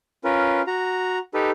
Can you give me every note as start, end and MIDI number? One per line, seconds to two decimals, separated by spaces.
0.24 0.61 61
0.24 0.61 65
0.24 0.61 70
0.24 0.61 71
0.67 1.19 66
0.67 1.19 82
1.34 1.51 63
1.34 1.51 67
1.34 1.51 69
1.34 1.51 71